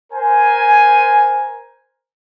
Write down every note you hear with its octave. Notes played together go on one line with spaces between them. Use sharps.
A#4 C5 G#5